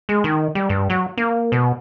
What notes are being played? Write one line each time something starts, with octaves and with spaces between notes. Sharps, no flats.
G#3
D#3
G3
G2
F#3
A#3
B2